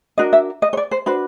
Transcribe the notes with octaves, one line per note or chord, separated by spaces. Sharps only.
D4 F#4 A#4 D#5
E5
D#5
C#5
D5
C5
D4 F#4 B4 C5